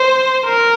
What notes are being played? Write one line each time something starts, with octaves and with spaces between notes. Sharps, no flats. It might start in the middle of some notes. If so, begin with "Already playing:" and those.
Already playing: C5
A#4